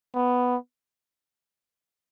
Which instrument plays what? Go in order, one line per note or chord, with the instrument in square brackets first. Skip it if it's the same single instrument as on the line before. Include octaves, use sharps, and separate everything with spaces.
[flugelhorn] B3